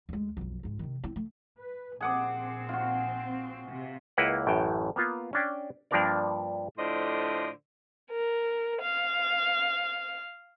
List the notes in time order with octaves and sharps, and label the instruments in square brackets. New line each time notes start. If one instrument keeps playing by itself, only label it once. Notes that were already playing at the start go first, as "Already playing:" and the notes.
[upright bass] D2 G#3
B1 F2
C#2 G#2
C3 D#3
C4 E4
A3
[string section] B4
[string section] A#1 C4 [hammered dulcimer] G#4 F#5 D6
[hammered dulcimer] F4 F#4
[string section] C3
[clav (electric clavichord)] C#2 A#3 E4 B4 D#5 F#5
A1 F#2 A2 G5
A#3 B3 F4
C#4 D4 G5
G2 F3 A#3 D4 A#4 D5
[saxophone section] A2 D3 F3 C5 D5 D#5
[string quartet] A#4
F5